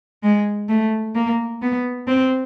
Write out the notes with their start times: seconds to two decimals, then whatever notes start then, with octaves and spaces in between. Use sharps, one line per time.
0.24 G#3
0.69 A3
1.15 A#3
1.62 B3
2.08 C4